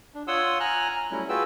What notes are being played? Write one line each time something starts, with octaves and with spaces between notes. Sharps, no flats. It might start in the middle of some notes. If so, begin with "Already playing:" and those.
D4
F4 C#5 F#5 C6 D#6 E6
G#5 A#5 F6 F#6
A#5
F#3 G3 A3 C#4 E4
F4 F#4 G#4 B4 G5 E6